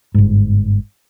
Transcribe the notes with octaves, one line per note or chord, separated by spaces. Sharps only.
G1 G#2